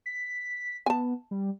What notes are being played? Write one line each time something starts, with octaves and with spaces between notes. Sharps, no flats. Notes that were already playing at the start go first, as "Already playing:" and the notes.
B6
B3 G#5 A5
G3